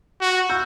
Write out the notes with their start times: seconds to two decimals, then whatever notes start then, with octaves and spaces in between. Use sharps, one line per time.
0.21 F#4
0.49 E6 G6